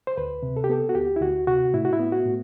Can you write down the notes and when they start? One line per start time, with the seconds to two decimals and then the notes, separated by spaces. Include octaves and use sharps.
0.07 C5
0.17 D2 B4
0.43 C3
0.56 A4
0.64 G4
0.69 B3 A4
0.89 F#4
0.95 D2 G4
1.16 E4
1.21 D2 F#4
1.47 C3 F#4
1.74 A2 E4
1.85 F#4
1.93 E4
1.99 B3
2.12 F#4
2.25 A2